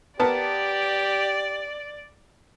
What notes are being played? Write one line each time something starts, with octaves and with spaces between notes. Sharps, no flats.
B3 G4 A#4 D5 A5